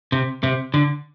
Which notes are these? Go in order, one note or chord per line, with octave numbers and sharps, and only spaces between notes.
C3
C3
D3